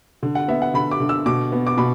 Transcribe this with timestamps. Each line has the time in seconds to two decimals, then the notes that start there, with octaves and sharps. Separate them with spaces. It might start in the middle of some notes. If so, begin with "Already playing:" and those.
0.23 D3
0.35 F#5
0.48 B3 E5
0.62 F#5
0.74 D3 B5
0.91 D6
1.00 D3
1.09 E6
1.26 B2 D6
1.52 B3
1.67 D6
1.78 B2 B5